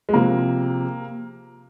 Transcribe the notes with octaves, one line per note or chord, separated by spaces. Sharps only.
G#3
C3 F3 A#3